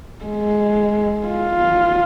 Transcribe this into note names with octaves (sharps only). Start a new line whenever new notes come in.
G#3
F4